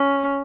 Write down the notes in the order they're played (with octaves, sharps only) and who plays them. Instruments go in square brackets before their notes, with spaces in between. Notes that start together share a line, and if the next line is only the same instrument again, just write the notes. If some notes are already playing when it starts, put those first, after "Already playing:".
Already playing: [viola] C#4